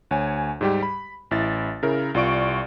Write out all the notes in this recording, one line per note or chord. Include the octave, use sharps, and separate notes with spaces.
D2 C#5 G#5
G#2 G3 G4
B5
A1 E4 A6
C#3 E4 A#4
C2 F4 D5 C#6 D7